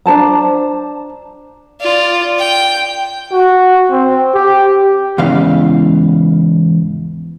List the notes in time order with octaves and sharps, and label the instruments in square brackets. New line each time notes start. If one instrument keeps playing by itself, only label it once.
[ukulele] D4 C5 A5 A#5
[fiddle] F4 D5
G5
[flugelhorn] F#4
C4
G4
[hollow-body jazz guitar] E2 G#2 C#3 E3 F5